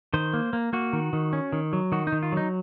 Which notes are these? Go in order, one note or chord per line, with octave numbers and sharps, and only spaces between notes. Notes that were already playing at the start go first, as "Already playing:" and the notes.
D#3 C5
A#3
A#3
A#3 F#4
D#3
D#3
C#4
D#3
F#3
D#3 F#4
D#4
D#3
F4
F#3 D#4